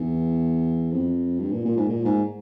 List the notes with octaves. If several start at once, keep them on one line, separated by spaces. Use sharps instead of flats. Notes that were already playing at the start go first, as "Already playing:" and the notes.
Already playing: E2
F2
G2
A#2
A#2
G#2
A#2
G#2